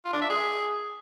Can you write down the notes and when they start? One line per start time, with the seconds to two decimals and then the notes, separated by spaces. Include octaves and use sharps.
0.05 F4
0.13 D4
0.21 E5
0.29 G#4